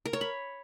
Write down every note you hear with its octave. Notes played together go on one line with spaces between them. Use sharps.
A#4
C#5
B5